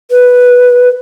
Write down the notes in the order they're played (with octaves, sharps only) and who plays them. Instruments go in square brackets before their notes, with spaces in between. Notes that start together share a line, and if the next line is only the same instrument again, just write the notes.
[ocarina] B4